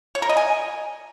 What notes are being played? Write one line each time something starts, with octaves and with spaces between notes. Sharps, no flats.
C#5
A#4
D#5
G#5